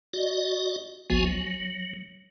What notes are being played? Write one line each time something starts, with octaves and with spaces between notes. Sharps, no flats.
F#4 D5 D#5
G#1 C#2 F3 B3 F#4 G#5
F#3